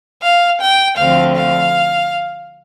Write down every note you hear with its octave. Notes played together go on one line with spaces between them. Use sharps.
F5
G5
D2 D3 F3 A3 C4 F5
F5